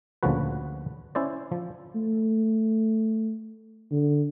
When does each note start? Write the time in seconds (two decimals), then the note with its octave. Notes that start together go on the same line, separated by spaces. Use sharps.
0.23 D2 A#2 C#3 F3 F#4 B4
1.15 C#4 E4 C5 D5
1.52 F3
1.95 A3
3.92 D3